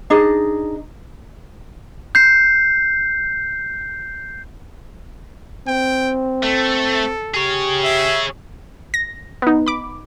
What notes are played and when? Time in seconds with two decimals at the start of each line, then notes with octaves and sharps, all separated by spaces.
0.10 D4 D#4 G#4 D#5
2.15 G6 C7
5.67 C4 G5
6.43 A3 A4
7.34 G4 G#4 C#5
7.84 E5
8.94 A#6
9.42 B3 D#4
9.66 B5 D6